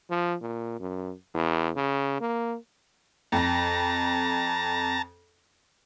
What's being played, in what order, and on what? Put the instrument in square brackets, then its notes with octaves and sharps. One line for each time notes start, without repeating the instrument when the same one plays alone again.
[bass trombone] F3
A#2
F#2
E2
C#3
A#3
[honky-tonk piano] F2 A#6 [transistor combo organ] A5 A#5